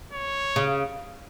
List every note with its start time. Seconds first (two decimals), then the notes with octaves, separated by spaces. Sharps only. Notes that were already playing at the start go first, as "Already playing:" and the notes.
0.13 C#5
0.56 C#3